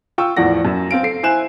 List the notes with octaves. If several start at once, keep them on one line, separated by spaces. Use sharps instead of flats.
F4 G5 C#6 E6
E2 A2 F3 D5 F#5 A#6
F#2
C4 F5 D7
A4 C7
E4 C5 G#5 F#6 E7